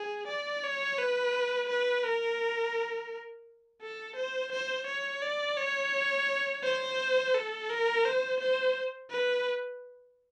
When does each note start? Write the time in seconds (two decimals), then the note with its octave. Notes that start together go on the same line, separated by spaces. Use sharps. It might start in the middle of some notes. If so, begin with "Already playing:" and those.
Already playing: G#4
0.27 D5
0.63 C#5
0.98 B4
1.69 B4
2.04 A#4
3.82 A4
4.16 C5
4.52 C5
4.87 C#5
5.22 D5
5.57 C#5
6.63 C5
7.34 A4
7.70 A#4
8.05 C5
8.40 C5
9.10 B4